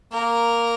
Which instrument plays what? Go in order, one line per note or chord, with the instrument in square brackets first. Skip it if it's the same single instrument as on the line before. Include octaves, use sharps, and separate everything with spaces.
[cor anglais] A#3 [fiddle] A#4